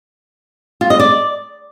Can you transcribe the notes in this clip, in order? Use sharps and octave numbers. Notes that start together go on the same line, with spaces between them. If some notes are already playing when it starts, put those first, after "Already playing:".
F4
D#5
D5